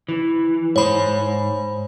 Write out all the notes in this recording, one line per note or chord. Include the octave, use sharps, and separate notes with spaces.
E3
G#2 C5 C#5 B5